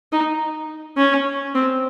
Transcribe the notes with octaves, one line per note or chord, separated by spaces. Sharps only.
D#4
C#4
C4